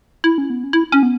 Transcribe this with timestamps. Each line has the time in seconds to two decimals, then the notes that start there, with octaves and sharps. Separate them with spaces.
0.24 E4
0.38 C#4
0.50 B3
0.64 C#4
0.73 E4
0.92 C#4
1.03 B3